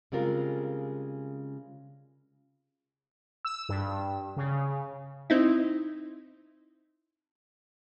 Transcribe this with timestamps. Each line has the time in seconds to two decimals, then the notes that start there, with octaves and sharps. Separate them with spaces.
0.12 C#3 G3 G#3 C4 F4 A#4
3.45 E6
3.69 G2
4.37 C#3
5.30 C4 D#4 E4